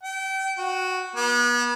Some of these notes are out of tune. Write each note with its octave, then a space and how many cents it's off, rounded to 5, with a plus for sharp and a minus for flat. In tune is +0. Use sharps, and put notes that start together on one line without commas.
G5 -30
F#4 -5
B3 -35